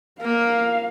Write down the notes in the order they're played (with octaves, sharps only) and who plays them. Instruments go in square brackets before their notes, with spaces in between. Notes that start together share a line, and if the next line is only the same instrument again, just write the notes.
[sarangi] A#3 [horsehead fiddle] F5